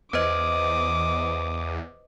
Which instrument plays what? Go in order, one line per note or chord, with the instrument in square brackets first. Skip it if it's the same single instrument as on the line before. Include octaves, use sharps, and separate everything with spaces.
[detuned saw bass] E2 [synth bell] B4 C5 D#5 [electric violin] D6 D#6